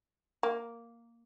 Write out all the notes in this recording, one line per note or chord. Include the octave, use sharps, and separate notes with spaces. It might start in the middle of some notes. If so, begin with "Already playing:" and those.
A#3